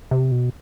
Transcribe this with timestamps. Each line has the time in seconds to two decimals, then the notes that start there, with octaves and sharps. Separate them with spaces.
0.11 C3
0.32 B2